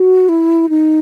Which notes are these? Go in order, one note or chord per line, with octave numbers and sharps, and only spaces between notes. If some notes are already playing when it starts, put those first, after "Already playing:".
Already playing: F#4
E4
D#4